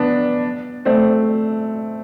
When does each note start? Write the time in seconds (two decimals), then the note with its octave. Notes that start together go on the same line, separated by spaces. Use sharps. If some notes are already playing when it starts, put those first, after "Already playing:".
Already playing: B3 D4
0.85 A3 C4